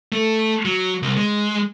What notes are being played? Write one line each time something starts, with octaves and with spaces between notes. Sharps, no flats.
A3
F#3
C2
G#3